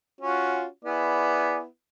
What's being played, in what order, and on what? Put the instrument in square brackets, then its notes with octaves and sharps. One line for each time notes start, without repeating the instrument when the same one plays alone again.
[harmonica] C#4 F4 F#4
[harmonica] B3 E4 [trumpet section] G#4 D5